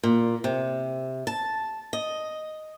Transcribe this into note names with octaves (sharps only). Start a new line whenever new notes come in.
A#2
C3
A5
D#5